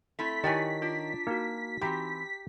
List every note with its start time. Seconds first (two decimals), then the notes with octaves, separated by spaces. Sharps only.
0.19 A3 C4 E4 B6
0.44 D#3 E4 G4 C#5 D5 G5 G#5
0.82 D4 F4
1.27 A#3 D#4 F#4
1.82 E3 C4 G4 A#5